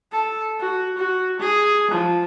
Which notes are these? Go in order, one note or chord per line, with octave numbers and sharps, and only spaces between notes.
A4
F#4
F#4
G#4
F3